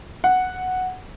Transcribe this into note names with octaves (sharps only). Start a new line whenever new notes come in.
F#5